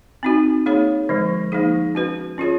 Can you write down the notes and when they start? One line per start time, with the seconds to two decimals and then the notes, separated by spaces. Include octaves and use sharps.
0.23 C4 D#4 F#4
0.66 A#3 D#4 G#4 C#5
1.09 D3 F3 G#3
1.52 F3 A#3 D#4 G#4
1.95 C#4 F#4 B4
2.38 C#4 F4 G#4 C#5